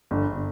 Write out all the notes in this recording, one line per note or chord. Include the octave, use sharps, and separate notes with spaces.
G1